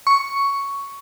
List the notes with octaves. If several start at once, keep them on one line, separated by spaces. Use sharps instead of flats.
C#6